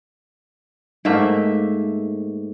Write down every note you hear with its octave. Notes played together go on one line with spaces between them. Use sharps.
G#2 A3 A#3 E5